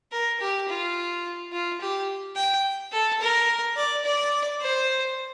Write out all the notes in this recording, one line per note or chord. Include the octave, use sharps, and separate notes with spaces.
A#4
G4
F4
F4
G4
G5
A4
A#4
D5
D5
C5